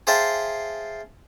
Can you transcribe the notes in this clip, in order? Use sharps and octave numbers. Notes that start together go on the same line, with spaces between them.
G#4 C5 E5 F5 G5 A5